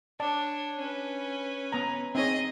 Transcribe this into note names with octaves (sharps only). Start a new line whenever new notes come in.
D4 C#5 D5 A5
C#4 B4
B3 A#5
C4 D#4 G#4 C#5 D#5